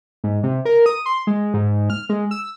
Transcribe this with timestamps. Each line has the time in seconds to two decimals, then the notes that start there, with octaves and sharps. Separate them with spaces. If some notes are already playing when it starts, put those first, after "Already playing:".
0.24 G#2
0.43 C3
0.65 A#4
0.86 D#6
1.06 C6
1.27 G#3
1.54 G#2
1.90 F6
2.09 G#3
2.31 E6